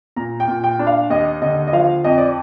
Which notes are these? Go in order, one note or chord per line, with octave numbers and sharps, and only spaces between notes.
A#2 A#5
G5
A#2
G5
D4
F5
D#2 D#5
D3 D#5
D#5
F3 F5
F2 D#5
D5